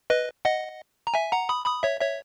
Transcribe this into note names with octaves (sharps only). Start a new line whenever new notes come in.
B4 D#5
D#5 F#5
A#5
E5 G#5
F#5 A#5
B5 D#6
B5 D#6
C#5 E5
C#5 E5